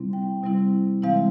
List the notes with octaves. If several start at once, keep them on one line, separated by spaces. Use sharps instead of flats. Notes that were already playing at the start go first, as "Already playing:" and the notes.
Already playing: C3 G3 C4 E4
G5
C3 G3 C4 E4
C3 E3 G#3 C4 E4 F5